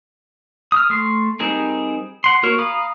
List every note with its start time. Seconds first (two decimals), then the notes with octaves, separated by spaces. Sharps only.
0.72 D#6 F6
0.90 A3 C6
1.40 G3 C4 D#4 G#4 A#4
2.24 F#5 C6
2.43 A#3 F#4 A#4 C#5
2.58 F5 A#5 B5 D#6